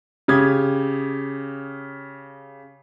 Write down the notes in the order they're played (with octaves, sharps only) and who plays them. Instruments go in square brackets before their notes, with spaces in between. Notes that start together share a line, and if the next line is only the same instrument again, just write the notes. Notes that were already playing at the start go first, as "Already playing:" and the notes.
[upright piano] C#3 G4 D#6 G#6